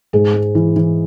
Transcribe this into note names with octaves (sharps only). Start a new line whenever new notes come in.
G#2 G#4
G#3
E3
E3